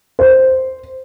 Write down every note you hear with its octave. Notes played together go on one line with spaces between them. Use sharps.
C5